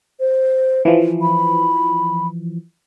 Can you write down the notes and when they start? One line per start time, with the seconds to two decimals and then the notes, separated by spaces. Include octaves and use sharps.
0.20 C5
0.85 E3 F3
1.22 B5